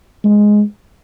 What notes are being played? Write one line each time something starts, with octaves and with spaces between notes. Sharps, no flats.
G#3